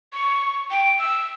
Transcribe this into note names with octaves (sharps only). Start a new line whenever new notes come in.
C#6
G5
E6